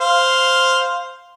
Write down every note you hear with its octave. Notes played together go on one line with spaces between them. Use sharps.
C5 F5